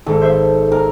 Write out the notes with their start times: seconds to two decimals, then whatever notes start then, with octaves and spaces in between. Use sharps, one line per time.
0.06 G#1 A4
0.21 C5 E5
0.72 A#4